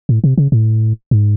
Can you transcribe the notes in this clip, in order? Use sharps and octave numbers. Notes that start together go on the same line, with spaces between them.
A2
C3
C#3
A2
G#2